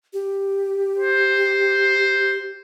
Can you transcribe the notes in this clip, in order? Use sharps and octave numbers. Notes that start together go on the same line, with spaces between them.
G4
C5